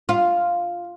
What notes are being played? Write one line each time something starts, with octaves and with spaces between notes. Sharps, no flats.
F4